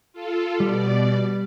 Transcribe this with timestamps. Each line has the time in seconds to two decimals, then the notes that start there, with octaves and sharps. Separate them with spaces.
0.13 F4 A4
0.60 B2 G3 D5